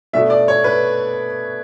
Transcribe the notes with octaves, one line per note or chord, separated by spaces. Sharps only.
B2 A3 D4 E5
D5
C#5
B4